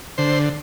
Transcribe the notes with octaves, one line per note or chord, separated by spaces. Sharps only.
D3 C5